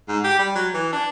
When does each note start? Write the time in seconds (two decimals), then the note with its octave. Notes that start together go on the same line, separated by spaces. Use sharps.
0.08 G#2
0.24 G4
0.39 G3
0.55 F#3
0.74 E3
0.93 D4